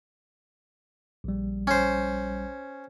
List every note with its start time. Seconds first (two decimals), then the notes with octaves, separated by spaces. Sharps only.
1.24 A#1 G3
1.67 C#4 C5